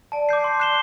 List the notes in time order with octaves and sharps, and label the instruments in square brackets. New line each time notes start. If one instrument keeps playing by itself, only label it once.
[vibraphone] D5 [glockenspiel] A5
[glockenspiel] D6 G6 C7
C6
F#6 C7 E7 G7